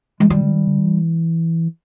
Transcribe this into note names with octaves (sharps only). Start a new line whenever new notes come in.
E3 G#3
D#3 G3
D3
D#3
D3
D#3
E3